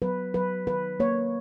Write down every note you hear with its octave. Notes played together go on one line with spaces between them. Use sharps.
F#3 B4
F#3 B4
D#3 B4
A#3 C#5